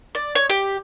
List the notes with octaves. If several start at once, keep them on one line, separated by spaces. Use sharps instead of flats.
D5
C#5
G4